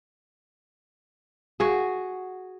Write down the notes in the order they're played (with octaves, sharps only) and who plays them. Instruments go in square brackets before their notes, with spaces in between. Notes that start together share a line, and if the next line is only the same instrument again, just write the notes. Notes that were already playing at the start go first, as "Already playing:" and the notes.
[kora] F#4 G#4